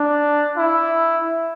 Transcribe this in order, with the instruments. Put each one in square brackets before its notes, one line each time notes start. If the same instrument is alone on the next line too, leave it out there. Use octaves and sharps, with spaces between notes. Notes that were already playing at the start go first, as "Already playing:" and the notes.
Already playing: [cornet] D4
E4